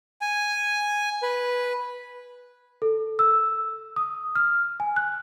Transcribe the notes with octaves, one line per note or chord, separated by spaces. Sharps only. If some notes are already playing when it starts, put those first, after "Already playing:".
G#5
B4
A4
E6
D#6
F6
G#5
F#6